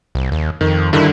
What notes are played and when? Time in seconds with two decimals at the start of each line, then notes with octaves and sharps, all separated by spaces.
0.15 C2
0.32 D#2
0.61 F2 D#3
0.93 G2 D3 D#3 E4